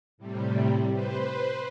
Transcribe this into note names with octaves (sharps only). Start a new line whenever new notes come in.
A2 C3 G3
B4 C5